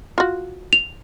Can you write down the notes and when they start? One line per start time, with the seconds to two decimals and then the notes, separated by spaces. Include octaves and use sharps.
0.18 F4 F#4
0.73 F7